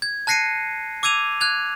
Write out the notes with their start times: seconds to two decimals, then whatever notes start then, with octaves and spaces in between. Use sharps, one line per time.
0.02 G#6
0.27 A5 F#6 A#6 C7 C#7 D#7
1.03 D6 E6 G#6 D#7 F7
1.41 F#6 G#6 F7